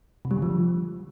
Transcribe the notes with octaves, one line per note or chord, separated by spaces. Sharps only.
C3
G3
D3
F3